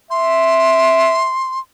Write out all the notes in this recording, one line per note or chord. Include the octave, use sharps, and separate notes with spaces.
E5 C6